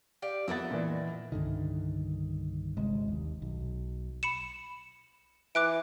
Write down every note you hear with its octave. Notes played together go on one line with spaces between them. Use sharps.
G4 D5 F5
F2 B3 D#5 E5 F#5 A6
A#2 E3
C2 G2 D3 D#3
G1 C3 G#3
D#2
B1
B5 C#7 E7
E3 D6 F#6 D7